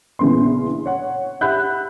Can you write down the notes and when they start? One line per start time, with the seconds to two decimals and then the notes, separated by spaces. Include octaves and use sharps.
0.19 A#1 C#3 E3 B3 C6
0.86 C#5 F#5
1.41 G4 E5 F#5 B5 F#6 G6